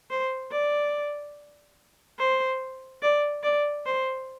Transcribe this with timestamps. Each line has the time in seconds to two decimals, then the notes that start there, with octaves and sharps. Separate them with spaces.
0.10 C5
0.51 D5
2.19 C5
3.02 D5
3.43 D5
3.86 C5